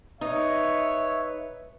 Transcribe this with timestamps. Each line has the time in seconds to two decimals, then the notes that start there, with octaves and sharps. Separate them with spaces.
0.21 D#4 B4 C#5 E5